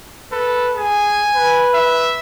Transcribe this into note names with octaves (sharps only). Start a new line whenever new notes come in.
A4 B4
G#4 G#5
B4
E5